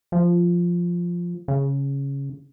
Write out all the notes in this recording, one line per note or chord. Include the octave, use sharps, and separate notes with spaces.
F3
C#3